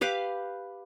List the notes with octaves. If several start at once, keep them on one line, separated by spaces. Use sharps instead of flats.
G4 B4 F5 D6